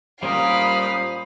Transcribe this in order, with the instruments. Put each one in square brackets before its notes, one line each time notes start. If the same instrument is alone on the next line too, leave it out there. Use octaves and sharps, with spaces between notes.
[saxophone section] A#2 C5 [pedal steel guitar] G3 C#4 A#4 [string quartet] F5 B5 [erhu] D#6